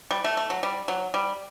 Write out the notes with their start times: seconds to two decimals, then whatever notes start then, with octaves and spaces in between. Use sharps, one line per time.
0.11 G3
0.24 A3
0.37 A3
0.50 F#3
0.63 G3
0.88 F#3
1.14 G3